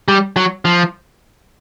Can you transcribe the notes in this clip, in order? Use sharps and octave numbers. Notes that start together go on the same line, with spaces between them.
G3
F#3
F3